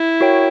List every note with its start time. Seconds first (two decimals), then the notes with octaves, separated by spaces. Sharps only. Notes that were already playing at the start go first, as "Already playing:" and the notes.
Already playing: E4
0.21 F#4 A#4 C#5 G5